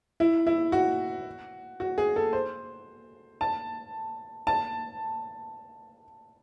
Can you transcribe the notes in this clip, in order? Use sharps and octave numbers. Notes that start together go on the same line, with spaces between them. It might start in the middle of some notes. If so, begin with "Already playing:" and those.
E4
E4
F#4
F#4
G#4
A4
C5
A5
A5